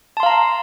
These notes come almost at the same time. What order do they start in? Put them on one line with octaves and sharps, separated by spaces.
A5 C6 F5 A#5